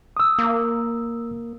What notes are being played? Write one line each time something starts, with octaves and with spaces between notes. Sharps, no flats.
D#6 E6
A#3